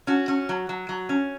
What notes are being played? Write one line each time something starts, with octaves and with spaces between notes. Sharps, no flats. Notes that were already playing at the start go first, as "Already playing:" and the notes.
C#4 F#4
C#4
F#3
F#3
F#3
C#4